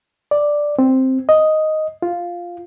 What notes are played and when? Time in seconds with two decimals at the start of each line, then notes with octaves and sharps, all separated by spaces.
0.31 D5
0.79 C4
1.29 D#5
2.02 F4